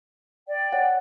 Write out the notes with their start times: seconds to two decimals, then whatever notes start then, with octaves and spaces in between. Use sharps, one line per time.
0.48 D5 G5
0.73 C#5 F#5